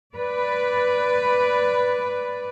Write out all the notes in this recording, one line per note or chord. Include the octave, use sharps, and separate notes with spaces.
B4 D5